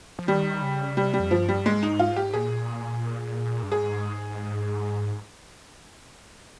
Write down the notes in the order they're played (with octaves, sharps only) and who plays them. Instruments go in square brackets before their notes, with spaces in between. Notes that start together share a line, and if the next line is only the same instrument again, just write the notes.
[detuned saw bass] F3
[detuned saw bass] D#3 [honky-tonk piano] G3
[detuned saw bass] C#3
[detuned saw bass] C3 [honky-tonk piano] G3
[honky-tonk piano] G3
[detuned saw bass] F2
[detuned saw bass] G2 [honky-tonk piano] F3
[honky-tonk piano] G3
[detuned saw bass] G2
[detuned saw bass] G#2 [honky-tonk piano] G#3
[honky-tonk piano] D#4
F4
G4
[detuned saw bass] A#2 [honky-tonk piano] G#4
[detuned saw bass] G2
[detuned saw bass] G#2 [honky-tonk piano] G#4